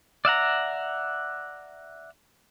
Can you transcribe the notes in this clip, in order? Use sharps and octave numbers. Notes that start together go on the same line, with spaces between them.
D5 E5 F#5 A#5